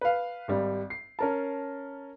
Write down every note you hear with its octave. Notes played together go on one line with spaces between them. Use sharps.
B4 F5
G#1 G3
C7
C#4 A#4 A5